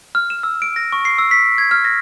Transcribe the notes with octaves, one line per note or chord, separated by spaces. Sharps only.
F6
E7
E6
D7
A#6
C#6
C7
E6
B6
G#6
F6
A#6